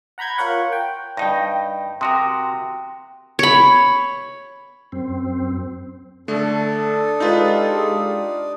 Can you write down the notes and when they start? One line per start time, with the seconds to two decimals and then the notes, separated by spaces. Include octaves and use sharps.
0.18 F#5 A#5 B5 G6 G#6
0.38 F4 A#4 C#5 F#5
0.72 G5
1.17 G2 D#4 G5 A#6
2.01 C3 F#4 A#4 G5 C6 D#6
3.39 C#5 B5
4.92 F#2 C4
6.28 D3 A3 D4 A4 D5 D#6
7.20 G#3 D#4 F4 G4 B4